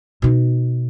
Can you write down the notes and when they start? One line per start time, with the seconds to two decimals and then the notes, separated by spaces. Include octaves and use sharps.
0.22 B2 D#4